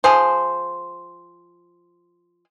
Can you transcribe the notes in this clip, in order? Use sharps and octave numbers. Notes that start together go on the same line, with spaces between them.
F3 G#4 C5